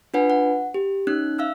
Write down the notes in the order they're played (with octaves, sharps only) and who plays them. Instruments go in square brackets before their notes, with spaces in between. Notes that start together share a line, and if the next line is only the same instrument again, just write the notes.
[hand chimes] D4 F4 B4 F#5 G#5
F#5
G4
C#4 D#4 F#6
E5 F5 E6 F6